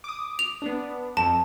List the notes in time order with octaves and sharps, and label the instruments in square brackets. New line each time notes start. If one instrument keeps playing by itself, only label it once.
[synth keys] D6 D#6
[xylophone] F7
[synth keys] B3 D4
[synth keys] F2 [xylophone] A5